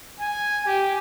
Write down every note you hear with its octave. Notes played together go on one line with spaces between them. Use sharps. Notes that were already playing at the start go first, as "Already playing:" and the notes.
G#5
G4